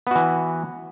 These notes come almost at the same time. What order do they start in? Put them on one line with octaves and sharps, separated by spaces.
B3 F#4 E3